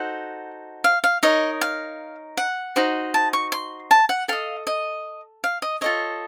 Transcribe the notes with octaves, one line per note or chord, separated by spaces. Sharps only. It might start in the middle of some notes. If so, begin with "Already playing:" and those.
Already playing: D#4 F#4 A4 C5 F#5
F5
F5
D#4 A#4 C#5 D#5
F5
F#5
D#4 F#4 C5 D#5
A5
C#6
C6
A5
F#5
A4 D#5 F5
D#5
F5
D#5
F4 A4 C#5 D#5